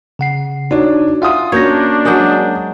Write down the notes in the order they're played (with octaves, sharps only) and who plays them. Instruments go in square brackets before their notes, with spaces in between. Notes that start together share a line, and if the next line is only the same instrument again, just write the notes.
[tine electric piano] C#3 F#5 C7
[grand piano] D4 [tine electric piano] D#4 F#4 C#5
[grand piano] F4 D#6 [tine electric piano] E5 F#5 G#5
[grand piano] A#3 C#4 [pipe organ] D4 [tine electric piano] F#4 G6 A#6 [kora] C#5
[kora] F#3 G#3 [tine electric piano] A#4 D#6 G6